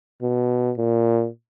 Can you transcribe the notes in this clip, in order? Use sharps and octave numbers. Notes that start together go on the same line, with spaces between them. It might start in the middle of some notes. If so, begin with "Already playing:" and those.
B2
A#2